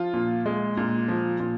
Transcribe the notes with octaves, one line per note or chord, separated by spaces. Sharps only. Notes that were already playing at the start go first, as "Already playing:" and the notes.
Already playing: F3 F4
A#2
G#3
A#2
F3
A#2